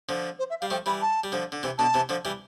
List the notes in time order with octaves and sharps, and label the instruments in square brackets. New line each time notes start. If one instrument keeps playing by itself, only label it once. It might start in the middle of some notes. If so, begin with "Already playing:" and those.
[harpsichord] D3 F3
[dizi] C5
E5
[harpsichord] G3 [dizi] F5
[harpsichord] F3 A3 [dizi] G5
[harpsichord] E3 G3 [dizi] B5
[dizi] A5
[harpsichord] G3
D3 F3
D3
C3 E3
[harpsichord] B2 D3 [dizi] A5
[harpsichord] C3 E3
D3 F3
E3 G3